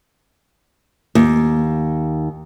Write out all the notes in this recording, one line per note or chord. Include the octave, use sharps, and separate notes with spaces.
D#2